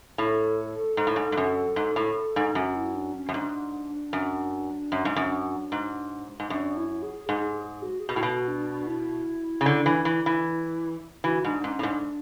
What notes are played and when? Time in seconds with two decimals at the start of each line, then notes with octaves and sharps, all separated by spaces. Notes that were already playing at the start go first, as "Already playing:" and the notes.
0.18 A2 A4
0.97 G#2
1.07 A2
1.16 G#2
1.32 G#2
1.37 F#2
1.76 G#2
1.96 A2
2.36 G#2
2.55 F#2 F#4
2.75 E4
2.95 D4
3.14 C#4
3.29 F#2
3.34 G#2 D4
4.13 F#2
4.92 F#2
5.05 G#2
5.16 F#2
5.72 G#2
6.40 G#2
6.50 F#2 D4
6.77 E4
7.02 G#4
7.29 G#2 G#4
7.55 G#4
7.82 F#4
8.00 G#4
8.09 B2 F#4
8.16 A2
8.23 B2
8.48 D4
8.87 E4
9.61 C#3
9.66 D3
9.86 E3
10.05 E3
10.26 E3
11.24 E3 F#4
11.44 G#2 D4
11.64 G#2 C#4
11.79 A2
11.83 G#2 D4